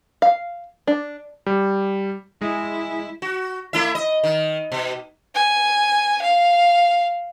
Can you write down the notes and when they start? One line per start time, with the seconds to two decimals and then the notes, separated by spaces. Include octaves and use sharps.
0.22 F5
0.87 D4
1.46 G3
2.41 G#3 E4
3.22 F#4
3.73 A3 E4 E5
3.95 D#5
4.24 D#3
4.72 B2
5.35 G#5
6.22 F5